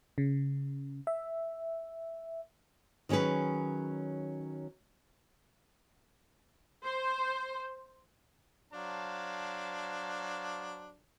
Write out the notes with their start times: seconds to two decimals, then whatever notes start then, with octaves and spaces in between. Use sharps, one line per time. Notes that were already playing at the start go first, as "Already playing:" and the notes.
0.18 C#3
1.07 E5
3.09 D#3 F#3 C#4 G#4 B4
6.83 C5
8.73 F#3 D4 C5 F5 A5